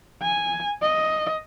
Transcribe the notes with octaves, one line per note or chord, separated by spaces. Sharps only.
G#5
D#5